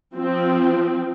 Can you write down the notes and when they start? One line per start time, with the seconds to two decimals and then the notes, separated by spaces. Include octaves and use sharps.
0.15 F3 C4